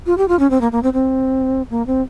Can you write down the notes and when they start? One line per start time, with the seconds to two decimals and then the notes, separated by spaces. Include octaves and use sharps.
0.06 F4
0.18 G4
0.28 F4
0.39 C#4
0.50 C4
0.61 A#3
0.72 A#3
0.83 C4
0.93 C4
1.70 A#3
1.87 C4